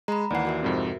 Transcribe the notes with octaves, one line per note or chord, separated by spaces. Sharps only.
G#3 A#5 B5
D#2 E3 D5 F#5 C7
F#4 A#4 E5
F2 G#2 C3